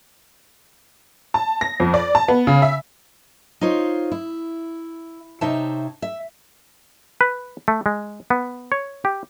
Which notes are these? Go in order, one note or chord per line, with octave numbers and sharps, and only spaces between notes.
A5
A#6
F2
D5
A5
B3
C#3
E5
D#4 F4 C5 C#5
E4
C3 D#4 C5 C#5 E5 A5
E5
B4
A3
G#3
B3
C#5
G4